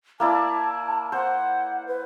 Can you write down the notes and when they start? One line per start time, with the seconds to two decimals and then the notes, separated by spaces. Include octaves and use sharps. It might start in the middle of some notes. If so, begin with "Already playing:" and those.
0.20 A#3 E4 D5 A5
1.12 C5 F#5
1.87 B4